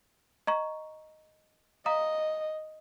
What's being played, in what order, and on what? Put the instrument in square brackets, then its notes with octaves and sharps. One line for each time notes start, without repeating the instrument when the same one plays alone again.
[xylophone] D#5 A#5 C#6
[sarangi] D#5 [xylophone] F5 A#5 D#6